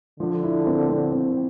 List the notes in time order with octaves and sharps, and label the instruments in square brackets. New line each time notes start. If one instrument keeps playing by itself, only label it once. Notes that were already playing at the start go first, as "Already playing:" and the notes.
[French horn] D3 [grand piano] F3
[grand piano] E4
C4
C4
C4